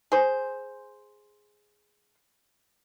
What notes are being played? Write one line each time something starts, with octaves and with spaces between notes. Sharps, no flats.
G#4 C5